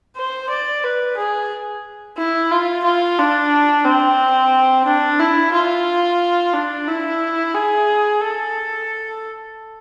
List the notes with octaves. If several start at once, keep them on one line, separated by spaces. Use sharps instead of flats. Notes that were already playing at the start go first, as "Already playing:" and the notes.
C5
D5
B4
G#4
E4
F4
F4
D4
C4
D4
E4
F4
D4
E4
G#4
A4